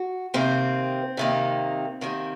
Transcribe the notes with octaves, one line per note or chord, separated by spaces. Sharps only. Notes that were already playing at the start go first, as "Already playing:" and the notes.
Already playing: F#4
C3 D#3 A#3 C4
C3 D#3 A#3
C3 D#3 A#3